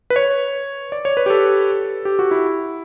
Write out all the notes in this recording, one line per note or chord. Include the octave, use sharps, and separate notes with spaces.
B4
C#5
D5
C#5
B4
G4
A4
G4
F#4
E4